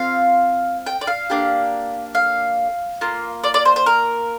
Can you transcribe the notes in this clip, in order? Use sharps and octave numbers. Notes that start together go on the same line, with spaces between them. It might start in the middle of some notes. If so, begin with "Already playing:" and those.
Already playing: C4 F4 F5
G5
D5
F5
A#3 D4 G4
F5
A#3 F4
D5
D5
C5
C5
A#4